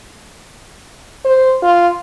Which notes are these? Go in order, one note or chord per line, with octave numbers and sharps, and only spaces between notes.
C5
F4